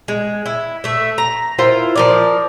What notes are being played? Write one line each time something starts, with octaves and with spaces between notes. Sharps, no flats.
G#3
E4
A3 E5
A#5
E4 F4 A#4 C5
F3 A#4 D5